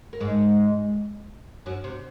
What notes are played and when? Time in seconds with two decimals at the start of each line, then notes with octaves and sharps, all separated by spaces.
0.13 A#3
0.20 G#2 G#3
1.66 F#2 F#3
1.84 C3